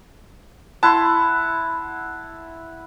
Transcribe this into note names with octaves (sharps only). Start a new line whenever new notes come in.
E4 F#5 A5 C6